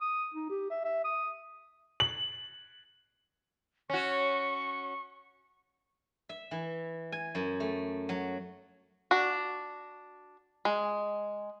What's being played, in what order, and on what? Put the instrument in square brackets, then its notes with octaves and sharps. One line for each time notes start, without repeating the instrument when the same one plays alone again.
[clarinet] D#6
D#4
G4
E5
E5
D#6
[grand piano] F#7
[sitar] C#4 F#4 [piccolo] C#6
[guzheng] E5
E3
G#5
F#2
A3
F#3
[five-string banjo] D4 F#4
G#3